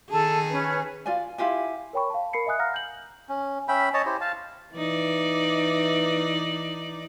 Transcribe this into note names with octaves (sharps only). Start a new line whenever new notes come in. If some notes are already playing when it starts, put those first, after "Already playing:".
D#3 G#4 A4 A5
C#4 B4
F4 D5 G#5
E4 F4 G4 G#5
A#4 C#5 G5 B5 C#6
F5 A5
A#4 B5 C7 C#7
D#5 E5 G#5 D#6 F#6
F5 F#5 A#5 F6 A#6
G6 F#7
C#4
C#4 E5 G5 B5
C#5 D#5 A5
E4 G4 C5
F5 A5
E3 D#4 D5